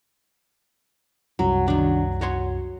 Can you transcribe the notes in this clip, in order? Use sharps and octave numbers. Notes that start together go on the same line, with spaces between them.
C2 F#2 F#3
D#3 F#3 D4
F#4 C#5 C6